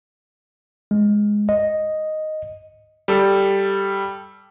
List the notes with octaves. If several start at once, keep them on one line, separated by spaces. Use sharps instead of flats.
G#3
D#5
G3 A4